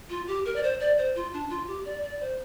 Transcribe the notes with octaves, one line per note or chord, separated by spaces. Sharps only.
F4
G4
A#4
D5
C5
D5
C5
F4
D4
F4
G4
D5
D5
C5